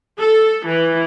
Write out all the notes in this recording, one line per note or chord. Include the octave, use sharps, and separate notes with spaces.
A4
E3